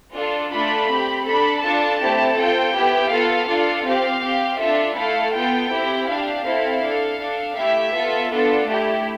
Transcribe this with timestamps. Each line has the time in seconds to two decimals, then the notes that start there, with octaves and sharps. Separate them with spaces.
0.15 D4 F4 A4
0.52 A3 D4 F4 A4 B5
0.89 C4 G4
1.26 D4 A4 B5
1.63 D4 F4 A4 A5
2.01 A3 C4 E4 G4
2.37 C4 F4 A4 G5
2.75 B3 E4 G4
3.12 B3 F4 A4 F5
3.48 D4 F4 A4
3.86 C4 G4 F5
4.23 C4 G4
4.60 D4 F4 A4 E5
4.97 A3 E4 A4 F5
5.34 B3 F4 A4 G5
5.71 C4 E4 G4
6.08 D4 G4 F5
6.46 C4 E4 A4
6.83 D4 A4
7.19 D4 A4
7.57 A3 E4 G4 E5
7.94 B3 F4 A4
8.31 B3 D4 F4 A4
8.68 A3 E4 G4